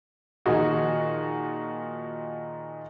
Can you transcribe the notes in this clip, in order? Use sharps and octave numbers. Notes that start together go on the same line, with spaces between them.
A#2 D#3 F3 D#4 F#4 G#4